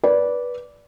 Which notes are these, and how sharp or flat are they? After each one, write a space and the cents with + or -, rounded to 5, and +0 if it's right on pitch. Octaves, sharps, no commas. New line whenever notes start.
B4 -15 D5 -15